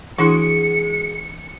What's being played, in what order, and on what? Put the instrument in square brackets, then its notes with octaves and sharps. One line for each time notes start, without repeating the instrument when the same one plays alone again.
[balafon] E3 D4 E4 [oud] G#3 F#4 [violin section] C#7